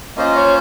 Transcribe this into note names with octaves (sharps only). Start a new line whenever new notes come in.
A#3 C#4 F4 C5 D#5
C#5